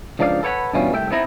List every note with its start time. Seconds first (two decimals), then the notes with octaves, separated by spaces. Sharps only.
0.19 C#2 F3 D4 D#4 D5 F5
0.43 A4 B4 C#5 F#5 G5 B5
0.73 G2 B2 E3 G3 C#4 F4
0.92 C2 A3 E5 G5
1.11 B3 C4 D#4 E4 A#5